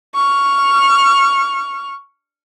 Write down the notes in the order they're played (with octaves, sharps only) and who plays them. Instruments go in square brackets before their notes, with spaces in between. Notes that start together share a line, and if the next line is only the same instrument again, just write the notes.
[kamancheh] C#6 F6